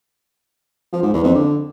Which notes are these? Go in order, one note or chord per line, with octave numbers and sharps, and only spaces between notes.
F3
G#2
E2
F2
D3